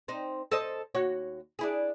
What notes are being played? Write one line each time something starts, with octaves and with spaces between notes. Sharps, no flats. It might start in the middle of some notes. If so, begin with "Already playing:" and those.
C4 D#4
A4 C5 D#5
D#2 F#4 C#5
D4 E4 G#4